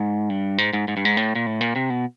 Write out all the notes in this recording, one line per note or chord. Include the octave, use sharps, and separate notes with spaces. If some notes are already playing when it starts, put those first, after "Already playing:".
Already playing: G#2
G2
G#2
G#2
G#2
G2
G#2
A2
A#2
A2
A#2
C3
B2